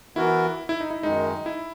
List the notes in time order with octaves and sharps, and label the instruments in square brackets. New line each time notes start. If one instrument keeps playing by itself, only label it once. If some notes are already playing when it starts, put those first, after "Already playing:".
[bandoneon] E3 B3 F#4 A#4 [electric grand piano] E4
[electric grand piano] E4
D#4
E4
[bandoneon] F#2 D#3 G#3 [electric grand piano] D#4
[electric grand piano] E4